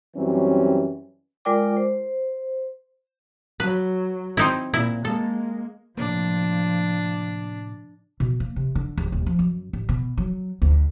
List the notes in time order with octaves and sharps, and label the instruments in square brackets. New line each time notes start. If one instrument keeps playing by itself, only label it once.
[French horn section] F#2 E3 F#3 G3 C4 C#4
[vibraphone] G#3 F4 A#4 D5 G5 D6
C5
[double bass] F#3 [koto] B4
[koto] C4 D#4 E4
[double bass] A#2 [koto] E4
[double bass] G#3 A#3 [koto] A4
[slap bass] A2 C3 A#3 [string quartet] F3 [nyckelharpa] D4
[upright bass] B2
A#3
C3
D3
D1
D#1
F3
F#2
A1
B2
F#3
D2